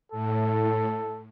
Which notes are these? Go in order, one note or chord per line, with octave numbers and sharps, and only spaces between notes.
A2 A4